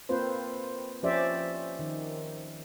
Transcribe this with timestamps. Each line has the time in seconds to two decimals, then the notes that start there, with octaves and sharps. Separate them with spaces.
0.09 A#3 C4 F4 B4 C5
1.03 F3 C#4 G4 C5 D5 E5
1.79 D#3